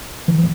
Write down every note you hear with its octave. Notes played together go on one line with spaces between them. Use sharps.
E3